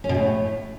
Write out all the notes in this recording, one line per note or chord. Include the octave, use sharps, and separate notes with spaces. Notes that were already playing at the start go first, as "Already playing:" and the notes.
C#4
B2
A2